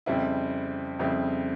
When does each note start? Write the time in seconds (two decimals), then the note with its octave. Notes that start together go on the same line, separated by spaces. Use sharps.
0.06 F2 C#3 G3 C4 E4
0.99 F2 C#3 G3 C4 E4